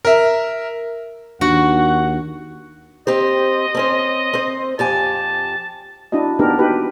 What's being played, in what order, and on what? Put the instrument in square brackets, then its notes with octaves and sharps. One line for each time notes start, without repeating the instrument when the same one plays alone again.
[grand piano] A#4 E5
[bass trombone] D#2 [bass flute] D4 [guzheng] F#4 [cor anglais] F#5
[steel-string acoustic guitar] C4 G4 C5 [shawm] D#5
[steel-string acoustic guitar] C4 C#4 C5
C4 C5
[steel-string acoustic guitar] F2 G4 G#5 [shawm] A5
[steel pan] D4 E4 F#4 D#5
A#3 B3 D4 D#4 G4 A#4
D#4 F#4 G4 B4